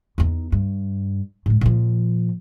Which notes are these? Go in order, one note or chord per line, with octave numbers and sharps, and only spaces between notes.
E2 D#4
G2
A2 G#3
A#2 F3